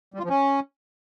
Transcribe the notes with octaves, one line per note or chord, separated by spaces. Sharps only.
G3
F4
F3
C#4